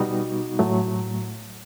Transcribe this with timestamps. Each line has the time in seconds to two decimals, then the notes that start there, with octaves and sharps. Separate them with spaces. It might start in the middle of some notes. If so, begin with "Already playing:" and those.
Already playing: B2 G3 B3 D#4 F#4
0.59 A2 F#3 A3